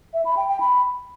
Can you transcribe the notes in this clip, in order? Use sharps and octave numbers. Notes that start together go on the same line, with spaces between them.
E5
B5
G5
G5
B5